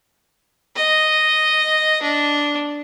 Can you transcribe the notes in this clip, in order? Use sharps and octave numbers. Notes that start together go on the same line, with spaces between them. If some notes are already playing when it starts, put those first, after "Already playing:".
D#5
D4